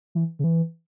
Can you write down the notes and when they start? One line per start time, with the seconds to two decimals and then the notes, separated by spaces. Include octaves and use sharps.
0.15 E3
0.39 C#3
0.44 E3